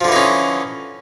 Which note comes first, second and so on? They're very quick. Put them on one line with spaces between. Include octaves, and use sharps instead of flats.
F3 D3 E3 D#4 C#4